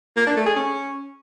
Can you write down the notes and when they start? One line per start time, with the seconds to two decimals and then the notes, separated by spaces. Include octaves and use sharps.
0.17 A#3
0.26 D4
0.36 A3
0.46 G#4
0.56 C#4